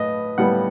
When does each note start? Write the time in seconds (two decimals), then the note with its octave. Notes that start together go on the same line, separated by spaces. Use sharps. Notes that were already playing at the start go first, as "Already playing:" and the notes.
Already playing: A2 B4 D#5
0.38 A2 G3 B3 F#5